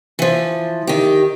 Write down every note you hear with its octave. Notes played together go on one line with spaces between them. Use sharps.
E3 F3
D#3 G4